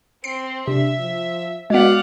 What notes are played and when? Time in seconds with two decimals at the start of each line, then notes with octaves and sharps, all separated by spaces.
0.24 C4 C7 D7
0.68 C3 D4 E5
0.98 F3
1.70 G#3 B3 F#4 D5 F5 F#5